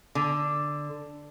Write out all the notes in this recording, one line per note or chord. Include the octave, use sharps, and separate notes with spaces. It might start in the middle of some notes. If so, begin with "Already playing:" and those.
D3